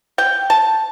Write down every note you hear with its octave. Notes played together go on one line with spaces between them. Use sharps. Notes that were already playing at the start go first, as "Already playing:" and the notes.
G5
A5